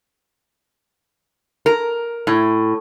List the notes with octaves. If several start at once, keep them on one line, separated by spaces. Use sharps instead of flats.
A#4
A2